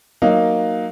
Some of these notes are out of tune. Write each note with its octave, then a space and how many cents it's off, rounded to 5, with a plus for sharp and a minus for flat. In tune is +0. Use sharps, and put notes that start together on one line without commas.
F#3 +0 A#3 +0 D#4 +0